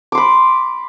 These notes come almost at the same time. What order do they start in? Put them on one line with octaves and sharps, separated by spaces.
D6 C6 B5